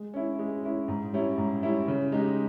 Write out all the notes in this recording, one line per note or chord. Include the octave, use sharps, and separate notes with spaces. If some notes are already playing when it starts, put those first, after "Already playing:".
Already playing: G#3
C#4 E4
G#3
C#4 E4
G#2
G3 C#4 E4
G#2
G3 C#4 E4
C#3
G#3 D#4 G4